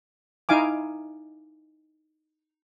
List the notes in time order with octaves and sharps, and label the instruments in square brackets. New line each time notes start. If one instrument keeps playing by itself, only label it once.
[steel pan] D#4 E4 F5 G#5 D6